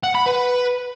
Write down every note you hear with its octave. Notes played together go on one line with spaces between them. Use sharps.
F#5
B5
B4